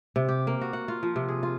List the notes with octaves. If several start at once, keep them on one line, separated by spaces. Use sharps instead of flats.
C3
G4
A#3
F#4
F#5
F4
F3
C3
G#4
F4